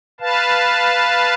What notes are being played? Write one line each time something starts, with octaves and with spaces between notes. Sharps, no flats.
B4 F5 A5